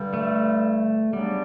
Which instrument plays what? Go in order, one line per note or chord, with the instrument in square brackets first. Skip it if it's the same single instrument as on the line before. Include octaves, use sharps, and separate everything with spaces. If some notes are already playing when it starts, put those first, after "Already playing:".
Already playing: [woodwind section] G2 D3 G3
[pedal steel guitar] A3
[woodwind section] C#3 F#3 B3 D4 [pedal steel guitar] G3